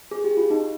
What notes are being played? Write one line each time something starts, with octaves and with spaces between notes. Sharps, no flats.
G#4
G4
F4
D#4
D#4